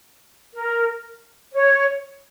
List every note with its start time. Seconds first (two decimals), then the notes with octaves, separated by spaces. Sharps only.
0.54 A#4
1.54 C#5